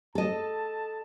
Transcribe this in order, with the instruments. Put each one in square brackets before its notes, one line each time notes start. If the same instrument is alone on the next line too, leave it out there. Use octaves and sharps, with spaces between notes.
[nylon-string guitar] A4 D#5 [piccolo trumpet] A5